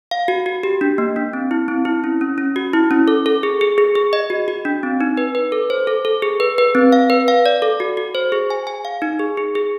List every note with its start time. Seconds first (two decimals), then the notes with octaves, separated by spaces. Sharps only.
0.11 F5
0.28 F#4
0.46 F#4
0.63 G4
0.81 D4
0.98 A#3
1.16 D4
1.33 C4
1.51 E4
1.68 C4
1.85 E4
2.04 C#4
2.21 C#4
2.38 C#4
2.56 F#4
2.73 E4
2.91 C#4
3.08 A4
3.26 A4
3.43 G#4
3.61 G#4
3.78 G#4
3.95 G#4
4.13 D#5
4.30 F#4
4.48 F#4
4.65 D4
4.83 C4
5.01 D#4
5.17 B4
5.35 B4
5.52 A4
5.70 C5
5.87 A4
6.05 A4
6.22 G#4
6.40 B4
6.58 B4
6.75 C4
6.92 F5
7.10 B4
7.28 F5
7.46 D5
7.62 A4
7.80 F#4
7.97 F#4
8.15 C5
8.32 G#4
8.50 G#5
8.67 G#5
8.85 F5
9.02 D#4
9.19 G#4
9.37 G#4
9.55 G#4